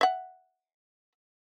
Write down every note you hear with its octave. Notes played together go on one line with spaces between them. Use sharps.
E5 F#5